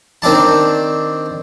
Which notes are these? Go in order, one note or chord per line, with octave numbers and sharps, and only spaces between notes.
D#3 C4 D4 A5